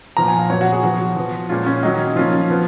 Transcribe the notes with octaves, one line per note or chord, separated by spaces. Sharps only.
A#2 F3 B3 A#5
G#5
F5
A#2 F#3 B3 C#5
F#4
G#4
F3 B3 F#4
F3 B3
A#2 G#3 C#4 F4
C#4
D#3 F#3 C#4 D#4
F3 A#3 C#4 F4
F3 B3